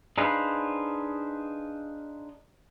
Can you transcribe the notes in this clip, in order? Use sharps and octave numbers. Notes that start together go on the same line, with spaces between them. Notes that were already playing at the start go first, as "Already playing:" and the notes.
D4 D#4 G#4 B4 C5 F5